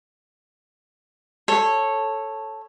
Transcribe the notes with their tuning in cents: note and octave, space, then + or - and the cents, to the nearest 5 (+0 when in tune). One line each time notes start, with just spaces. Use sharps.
A4 +0 C#5 -10